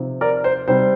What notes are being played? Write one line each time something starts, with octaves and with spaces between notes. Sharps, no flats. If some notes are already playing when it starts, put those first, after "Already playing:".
Already playing: C3 F3 C4 D#4
A#4 D5
C5
C3 G3 C4 D#4 C5